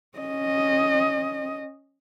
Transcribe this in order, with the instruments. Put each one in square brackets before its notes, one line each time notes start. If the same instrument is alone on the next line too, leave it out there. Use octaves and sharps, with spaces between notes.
[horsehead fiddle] C#4 D#5